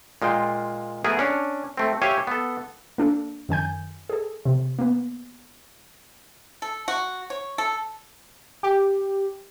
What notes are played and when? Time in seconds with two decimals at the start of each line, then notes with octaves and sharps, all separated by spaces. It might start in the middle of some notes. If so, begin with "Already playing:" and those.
0.22 A#2 G#3 F4 G5
1.04 A3 B3 G#4 A#4 B4
1.19 C#4 D4
1.77 A3 C4
2.02 G4 C#5 E5 F5 G5 G#5
2.27 B3 A4
2.98 A#3 D4 A4
3.49 F#2 D#3 G#5 G6
4.10 G#4 A4
4.45 C3
4.79 A#3 B3
6.62 A4
6.88 F#4
7.30 C#5
7.58 A4
8.63 G4